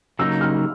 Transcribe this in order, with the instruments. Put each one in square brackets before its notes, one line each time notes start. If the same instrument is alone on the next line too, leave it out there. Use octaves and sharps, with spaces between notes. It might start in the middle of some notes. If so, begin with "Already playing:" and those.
[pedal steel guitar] C#3 F#3 A#3 D#4 [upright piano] E6
[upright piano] F6